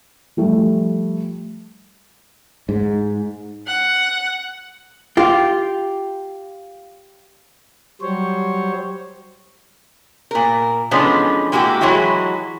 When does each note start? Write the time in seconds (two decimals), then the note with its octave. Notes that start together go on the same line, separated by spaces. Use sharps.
0.37 F3 G3 A3
2.69 G#2
3.67 F#5 F#6
5.17 F4 G4
8.01 F#3 G3 C5 C#5
10.31 A#2 A#4
10.91 D3 E3 F3 G#3 B3 C#4
11.52 G#3 A#3 E4 F#4 G4
11.81 E3 F#3 G#3 E4 F#4